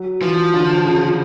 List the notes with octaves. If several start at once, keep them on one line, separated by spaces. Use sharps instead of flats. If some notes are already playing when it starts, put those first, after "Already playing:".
Already playing: F#3
E3 F3
D3
C#3